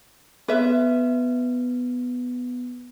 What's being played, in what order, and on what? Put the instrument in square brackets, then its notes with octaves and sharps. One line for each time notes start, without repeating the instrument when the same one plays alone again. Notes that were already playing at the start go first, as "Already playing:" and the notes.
[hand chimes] B3 [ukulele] B4 E5